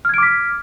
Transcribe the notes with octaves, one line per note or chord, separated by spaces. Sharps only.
D6 F6 G#6 B6 D7